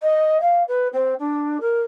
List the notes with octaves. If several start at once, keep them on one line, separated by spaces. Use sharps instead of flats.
D#5
F5
B4
C4
D4
A#4